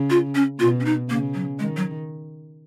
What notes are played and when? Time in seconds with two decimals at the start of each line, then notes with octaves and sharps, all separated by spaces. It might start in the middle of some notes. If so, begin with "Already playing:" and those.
Already playing: C#3
0.10 F4
0.35 C#4
0.60 B2 F4
0.80 C#4
0.85 D#4
1.09 C#3 A#3
1.34 F#3
1.59 D#3 G#3
1.77 F#3